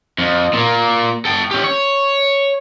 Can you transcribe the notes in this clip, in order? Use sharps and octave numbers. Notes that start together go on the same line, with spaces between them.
F2
A#2 A#3
A4 G5
C#4 G4
C#5